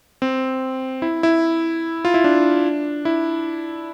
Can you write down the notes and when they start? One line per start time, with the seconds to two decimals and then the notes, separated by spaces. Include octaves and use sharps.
0.22 C4
1.02 E4
1.23 E4
2.05 F4
2.14 E4
2.24 D4
3.05 E4